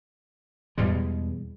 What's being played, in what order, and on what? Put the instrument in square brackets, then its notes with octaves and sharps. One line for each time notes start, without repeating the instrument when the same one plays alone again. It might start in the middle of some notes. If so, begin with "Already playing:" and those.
[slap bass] E2 B2 G3 G#3